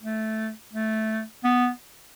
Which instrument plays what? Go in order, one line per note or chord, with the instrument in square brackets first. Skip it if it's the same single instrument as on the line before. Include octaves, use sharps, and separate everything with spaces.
[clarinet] A3
A3
B3